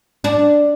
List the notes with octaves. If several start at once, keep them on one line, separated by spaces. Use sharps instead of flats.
D4